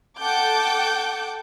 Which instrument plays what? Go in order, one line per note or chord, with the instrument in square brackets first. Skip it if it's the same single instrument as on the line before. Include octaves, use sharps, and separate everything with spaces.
[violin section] A4 F#5 G5 A5 D6 G6